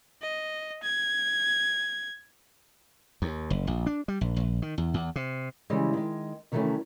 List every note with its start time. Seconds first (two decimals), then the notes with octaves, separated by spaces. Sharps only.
0.22 D#5
0.83 G#6
3.22 D#2
3.50 F#1
3.67 A#1
3.86 D4
4.08 G3
4.21 A#1
4.36 A#1
4.62 D#3
4.78 E2
4.94 E2
5.16 C3
5.70 C#3 E3 G3 G#3
5.93 D#3 G#3
6.52 C3 D#3 E3 F#3 A3 C#4